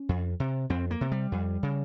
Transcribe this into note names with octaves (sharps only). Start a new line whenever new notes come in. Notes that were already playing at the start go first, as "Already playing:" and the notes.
Already playing: C#4
F2
C3
F2 C4
A#3
C3
G3
F2
C#3